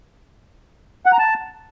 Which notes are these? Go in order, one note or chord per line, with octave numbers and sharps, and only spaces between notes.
F#5
A#5
A5